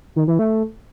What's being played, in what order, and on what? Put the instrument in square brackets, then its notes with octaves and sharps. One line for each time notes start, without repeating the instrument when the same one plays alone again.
[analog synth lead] D#3
E3
A3